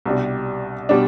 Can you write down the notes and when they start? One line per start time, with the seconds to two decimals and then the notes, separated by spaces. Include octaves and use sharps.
0.06 C2 B2 G3 D4
0.89 B2 G3 D4